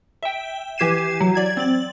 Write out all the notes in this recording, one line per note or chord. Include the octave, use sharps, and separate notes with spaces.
E5 G5
E3 G4 G#6 C7 D#7 E7
F#3
D5 G#6
C4 A6 F#7